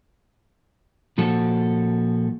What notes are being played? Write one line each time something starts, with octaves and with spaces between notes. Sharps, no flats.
A#2 F3 F#4 A4